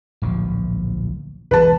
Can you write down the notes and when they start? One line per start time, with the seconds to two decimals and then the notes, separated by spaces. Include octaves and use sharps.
0.22 D1 A#1 F3
1.51 B1 E2 E3 B4 A5